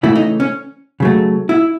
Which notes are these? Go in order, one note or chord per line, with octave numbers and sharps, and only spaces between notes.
C#3 E3 A3 E4
D#4
C#4
C#3 F#3 A3
E4